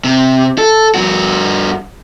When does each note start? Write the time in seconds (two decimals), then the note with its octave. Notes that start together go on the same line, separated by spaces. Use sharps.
0.04 C3
0.58 A4
0.94 G2 F#4